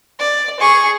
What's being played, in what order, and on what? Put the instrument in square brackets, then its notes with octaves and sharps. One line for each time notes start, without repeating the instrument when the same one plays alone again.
[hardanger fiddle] D5
G#4 C#6